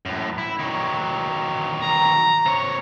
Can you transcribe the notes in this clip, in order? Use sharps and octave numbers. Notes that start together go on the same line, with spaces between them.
F#2 A2
E4
D#3 F#3
A#5
C3 C#5